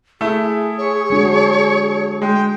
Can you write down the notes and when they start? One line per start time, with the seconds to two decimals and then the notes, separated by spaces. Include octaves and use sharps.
0.21 A3 E4 G#4
0.78 C#5
1.10 G#3 D4 F#4
2.22 G#3 G5